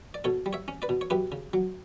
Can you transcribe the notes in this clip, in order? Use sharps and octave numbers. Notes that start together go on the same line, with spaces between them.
D5
B2 A4 C#5
G3
C#5 E5
C#4
B4 D5
B2
C#5
F#2 G4 B4
C#3
F#3